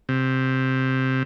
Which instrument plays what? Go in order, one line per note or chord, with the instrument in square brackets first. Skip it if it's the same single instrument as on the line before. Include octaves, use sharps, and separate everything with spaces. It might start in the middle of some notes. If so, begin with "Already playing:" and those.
[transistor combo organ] C3